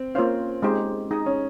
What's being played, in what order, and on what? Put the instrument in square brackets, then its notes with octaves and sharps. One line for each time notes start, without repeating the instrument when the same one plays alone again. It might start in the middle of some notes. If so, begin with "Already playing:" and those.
Already playing: [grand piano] C4
[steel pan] A#3 F4 C5 F5 [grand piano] C#4
[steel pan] G#3 C4 D#4 G4 C5
D#4 G#4 D#5
[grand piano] C#4